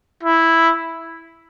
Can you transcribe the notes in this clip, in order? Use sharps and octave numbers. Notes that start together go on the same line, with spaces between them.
E4